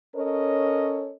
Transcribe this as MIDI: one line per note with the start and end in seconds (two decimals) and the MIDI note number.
0.15 1.12 61
0.15 1.12 69
0.15 1.12 70
0.15 1.12 73
0.15 1.12 75